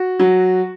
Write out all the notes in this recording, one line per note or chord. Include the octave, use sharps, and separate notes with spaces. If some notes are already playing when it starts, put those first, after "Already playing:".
Already playing: F#4
F#3